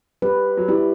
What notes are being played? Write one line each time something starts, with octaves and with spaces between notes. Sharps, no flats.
G3 B4
F#3
G3 E4